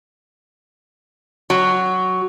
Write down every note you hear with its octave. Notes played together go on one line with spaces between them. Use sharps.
F#3